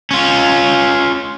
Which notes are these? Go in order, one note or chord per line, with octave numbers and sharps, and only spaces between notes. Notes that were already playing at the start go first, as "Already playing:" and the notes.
C#4 F4